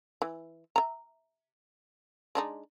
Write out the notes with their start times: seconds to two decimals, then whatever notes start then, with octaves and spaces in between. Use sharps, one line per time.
0.22 E3
0.76 E5 A#5
2.35 G#3 D4 D#4